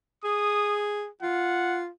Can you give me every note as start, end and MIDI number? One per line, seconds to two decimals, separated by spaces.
0.24 1.07 68
0.24 0.84 87
1.22 1.88 65
1.22 1.81 78